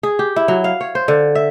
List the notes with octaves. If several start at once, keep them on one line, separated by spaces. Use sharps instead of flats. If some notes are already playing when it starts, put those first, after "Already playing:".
G#4
G4
E4
F#3
F5
C#5
C5
D3
E5